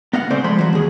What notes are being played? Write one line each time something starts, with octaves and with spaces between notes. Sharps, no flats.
B3 D#5 F5 F#5
C#3 A3 C4 C5 D5
F3 G#3 B5 C6
E3 F#3
D#2 G#4